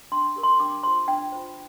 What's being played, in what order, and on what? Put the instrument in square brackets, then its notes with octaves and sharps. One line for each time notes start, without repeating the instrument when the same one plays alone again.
[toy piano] D4 C6
G4 A#4
C6
D4 D6
F4 C5 C6
D4 G5
F4 C5